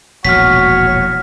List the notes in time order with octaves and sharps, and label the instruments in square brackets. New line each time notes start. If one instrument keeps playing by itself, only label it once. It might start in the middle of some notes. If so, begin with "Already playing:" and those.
[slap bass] E1 A#1 A2 [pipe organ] F#4 C#5 [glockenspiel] F6 B6